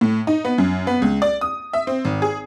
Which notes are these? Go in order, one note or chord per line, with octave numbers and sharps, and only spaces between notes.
A2
D#4
B3
F#2
B3
C#2
D5
D#6
E5
C4
G#1
G#4